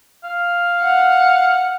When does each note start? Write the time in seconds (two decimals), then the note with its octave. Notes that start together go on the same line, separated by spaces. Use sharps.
0.24 F5
0.82 F#5